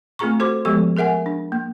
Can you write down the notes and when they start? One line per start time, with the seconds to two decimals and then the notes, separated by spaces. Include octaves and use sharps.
0.19 A3 C4 F4 G#4 A#5 C#6
0.39 F#4 A4 C5 C6 D6
0.65 F3 G#3 B3 G4 A4 C#6
0.97 G#4 A#4 E5 F#5 G#5
1.26 D4
1.52 A#3